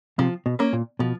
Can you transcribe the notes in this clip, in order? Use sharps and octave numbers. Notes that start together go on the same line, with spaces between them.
C3 F3
B2
A#3 C#4
A#2
B2 F3